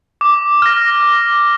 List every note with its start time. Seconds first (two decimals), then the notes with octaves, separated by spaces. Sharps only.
0.21 D6
0.62 F6 A#6
1.03 D6